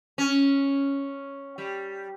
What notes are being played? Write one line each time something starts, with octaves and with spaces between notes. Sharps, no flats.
C#4
G3